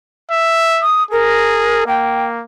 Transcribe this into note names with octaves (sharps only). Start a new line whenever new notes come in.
E5
D#6
G#4 A#4
A#3 G5